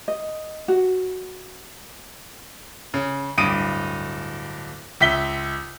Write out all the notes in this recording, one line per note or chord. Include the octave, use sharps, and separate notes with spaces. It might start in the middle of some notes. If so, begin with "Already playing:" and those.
D#5
F#4
C#3
D1 G2 D#6 D7 D#7
C#2 E5 B6 G7